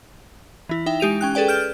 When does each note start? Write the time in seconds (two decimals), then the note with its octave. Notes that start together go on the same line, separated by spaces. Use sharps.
0.69 E3 E4
0.86 D#4 E5 G5
1.00 G#3 G4 D#7 F7
1.21 C#4 G5 F#6
1.35 G#4 A4 B4 D5 G5
1.48 F6 G6 D7 E7 G7